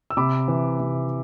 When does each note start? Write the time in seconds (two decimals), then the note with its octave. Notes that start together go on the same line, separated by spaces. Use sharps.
0.10 E6
0.17 C3 B5 D6
0.48 E3
0.80 C3